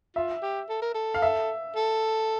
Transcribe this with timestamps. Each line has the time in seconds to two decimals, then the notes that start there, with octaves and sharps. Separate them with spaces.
0.16 F4 E5
0.42 G4
0.69 A4
0.82 A#4
0.94 A4
1.14 F5
1.22 E5
1.75 A4